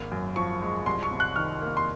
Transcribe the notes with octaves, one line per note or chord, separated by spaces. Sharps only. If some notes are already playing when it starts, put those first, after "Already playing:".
Already playing: G#1 A#3
F#2
F3 C#6
G#3
C2 C6
C#6
C3
F#6
D#3 F6
A#3
C6